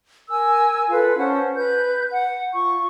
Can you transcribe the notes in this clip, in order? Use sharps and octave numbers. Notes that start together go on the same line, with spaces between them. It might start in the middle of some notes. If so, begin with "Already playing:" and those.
A#4 G#5 E6
F4 A4 B4 F5
C#4 C5 F#5 A5
B4 G6
F#5
F4 C#6